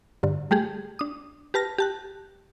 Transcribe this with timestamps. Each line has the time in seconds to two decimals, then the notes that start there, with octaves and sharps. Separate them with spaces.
0.23 G2 D3
0.51 G3 A3 G4 G#4
0.99 D4 D#6
1.54 G4 B4 A5 F6 A#6
1.78 G4 A5 F#6